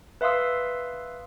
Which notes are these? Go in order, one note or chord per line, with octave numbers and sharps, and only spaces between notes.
B4 E5 F5 C6 D#6 E6